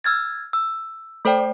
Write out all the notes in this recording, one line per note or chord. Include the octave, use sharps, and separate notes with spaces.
E6 F6 G#6 A6
E6
A3 A4 C5 D5 G5